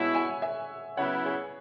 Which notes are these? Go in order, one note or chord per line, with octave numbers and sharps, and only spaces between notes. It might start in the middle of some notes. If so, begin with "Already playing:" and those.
Already playing: B2 G#3 E4 C#5 F#5
E5 G#5
E5 G#5
C#3 F#3 B3 E4 C#5 F#5
G#4 C#5